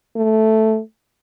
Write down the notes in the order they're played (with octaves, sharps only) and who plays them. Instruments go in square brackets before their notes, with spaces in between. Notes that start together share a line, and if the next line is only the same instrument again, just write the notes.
[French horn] A3